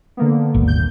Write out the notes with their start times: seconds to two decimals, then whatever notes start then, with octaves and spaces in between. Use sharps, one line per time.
0.17 D3 A#3 B3
0.54 D#1 G#1
0.68 G6